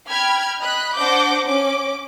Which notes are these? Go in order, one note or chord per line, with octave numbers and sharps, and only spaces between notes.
G5 B5 F6 G#6
D#5 B5 F#6
D4 C5 F#5 D6 G6 A#6
C#4 D6